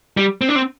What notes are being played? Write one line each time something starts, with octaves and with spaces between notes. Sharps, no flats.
G3
C4
D4
C4